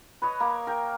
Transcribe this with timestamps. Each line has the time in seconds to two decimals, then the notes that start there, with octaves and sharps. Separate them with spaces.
0.22 B4 C#5 D#5
0.40 A#3
0.67 A#4 G5